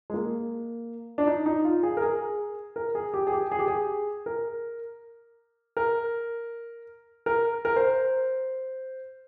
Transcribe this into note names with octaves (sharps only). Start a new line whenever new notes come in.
G#3
A#3
D4
D#4
D#4
F4
G#4
A#4
G#4
A#4
G#4
G4
G#4
G4
G#4
G4
G#4
A#4
A#4
A#4
A#4
C5